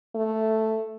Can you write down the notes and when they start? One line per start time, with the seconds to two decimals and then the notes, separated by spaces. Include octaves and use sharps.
0.15 A3